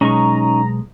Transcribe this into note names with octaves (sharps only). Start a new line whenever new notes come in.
B1 G#3 C#4 D#4 A#5 C#6